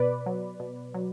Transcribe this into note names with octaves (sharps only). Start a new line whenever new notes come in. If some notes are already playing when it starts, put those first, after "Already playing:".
Already playing: B2 B4 D5
F#3
B2
F#3